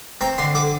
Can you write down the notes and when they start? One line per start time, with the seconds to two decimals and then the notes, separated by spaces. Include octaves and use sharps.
0.21 C4 A#5
0.38 D3 C6
0.55 D3 D6